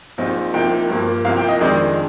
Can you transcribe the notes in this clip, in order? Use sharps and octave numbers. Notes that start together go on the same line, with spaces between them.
A#1 A#2 F3 C4 D#4
C2 C3 F3 A#3 D#4 G5
G2 F3 A#3
C2 C3 F3 A#3 F5
G5
D#5
F2 D#3 G#3 D4 D#5